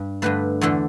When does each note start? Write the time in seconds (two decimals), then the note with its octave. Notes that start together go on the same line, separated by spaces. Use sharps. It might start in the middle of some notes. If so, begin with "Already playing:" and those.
Already playing: G2
0.22 G2 D3 A3 B4
0.61 E2 D3 A3 A4